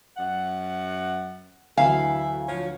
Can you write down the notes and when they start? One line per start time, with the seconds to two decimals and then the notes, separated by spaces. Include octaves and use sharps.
0.17 F#2 F#5
1.78 D2 E3 F#3 E4 A4 E5 F5 G#5
2.49 F3 C#5